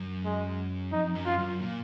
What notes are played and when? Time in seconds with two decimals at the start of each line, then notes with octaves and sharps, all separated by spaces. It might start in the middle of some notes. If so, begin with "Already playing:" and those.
Already playing: F#2
0.24 G#3
0.92 F2 D#4
1.15 F#2
1.26 F4
1.38 F#2
1.60 A#2